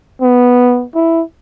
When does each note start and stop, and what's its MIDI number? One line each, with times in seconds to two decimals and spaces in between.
0.22 0.85 59
0.95 1.22 64